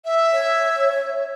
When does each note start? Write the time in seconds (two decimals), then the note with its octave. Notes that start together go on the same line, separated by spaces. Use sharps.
0.05 E5
0.32 C#5